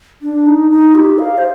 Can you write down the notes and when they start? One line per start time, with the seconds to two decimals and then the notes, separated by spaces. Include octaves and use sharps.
0.22 D4
0.46 D#4
0.71 D#4
0.95 G4
1.19 F5
1.38 C5